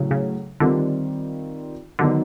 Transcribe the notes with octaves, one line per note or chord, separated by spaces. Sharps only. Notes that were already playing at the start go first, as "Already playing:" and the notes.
Already playing: A2 C#3 F#3
C#3
D3 D#3 G3 C4 F4
D3 D#3 F#3 B3 D#4